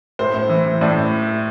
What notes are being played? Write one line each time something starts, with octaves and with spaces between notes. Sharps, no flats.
A2 C5
A2
E3
E3
A2 D5